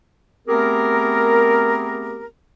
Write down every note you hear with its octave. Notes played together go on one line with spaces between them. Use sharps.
A3 B3 C4 G4 G#4 A#4